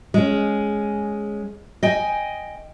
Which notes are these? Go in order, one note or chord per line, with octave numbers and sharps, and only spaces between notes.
G#3 C#4
D#5 G5 G#5